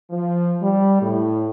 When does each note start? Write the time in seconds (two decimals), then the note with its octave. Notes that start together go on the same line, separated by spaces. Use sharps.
0.11 F3
0.60 G3
1.01 A2